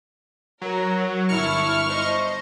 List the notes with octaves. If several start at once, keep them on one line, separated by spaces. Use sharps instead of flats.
F#3 A#4
G1 E4 A5 C#6 F6
C5 D#5